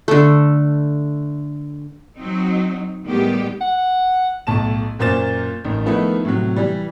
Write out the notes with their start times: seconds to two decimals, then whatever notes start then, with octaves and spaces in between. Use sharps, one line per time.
0.08 D3 A3
2.17 F#3 C4 D#4
3.04 A2 D#3 G3 G#3 B3 G4
3.61 F#5
4.47 B1 A2 A5 E7
4.99 F#2 A#2 A#3 C5 A6 E7
5.65 A1 D#3
5.86 D#3 F3 A3 B3 D#4 E4
6.25 A2 C3 F#3
6.56 E3 G3